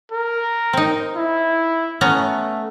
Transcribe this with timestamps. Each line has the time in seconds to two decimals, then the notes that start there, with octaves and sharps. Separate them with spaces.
0.12 A#4
0.73 C4 D#4
1.16 E4
2.01 A3 B3 C#4 A#5